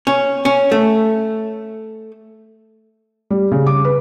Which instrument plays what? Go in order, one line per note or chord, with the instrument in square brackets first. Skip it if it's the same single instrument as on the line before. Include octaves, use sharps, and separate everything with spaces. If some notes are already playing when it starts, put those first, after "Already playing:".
[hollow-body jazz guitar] C#4
C#4
A3
[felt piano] G3
C#3
D6
B4